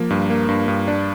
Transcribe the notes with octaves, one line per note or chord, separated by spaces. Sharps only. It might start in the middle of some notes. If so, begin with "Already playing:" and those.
Already playing: F3 A#3
G2
A#3
G2
G2
D4